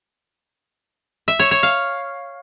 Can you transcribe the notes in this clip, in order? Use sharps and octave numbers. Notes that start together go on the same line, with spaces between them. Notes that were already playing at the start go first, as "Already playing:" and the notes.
E5
C#5
C#5
F5